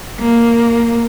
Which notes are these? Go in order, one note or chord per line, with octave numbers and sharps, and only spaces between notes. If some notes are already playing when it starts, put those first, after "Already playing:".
A#3